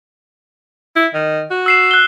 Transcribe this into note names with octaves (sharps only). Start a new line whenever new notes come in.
E4
D#3
F#4
E6 C7 E7
F#6 G7